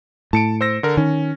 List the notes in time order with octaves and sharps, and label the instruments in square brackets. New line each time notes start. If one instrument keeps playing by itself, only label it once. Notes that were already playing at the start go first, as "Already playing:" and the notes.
[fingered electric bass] A2 [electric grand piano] A5 C#7 D7
[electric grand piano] C5 E6 A#6
D3 A#4
[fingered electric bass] D#3 [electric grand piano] C#4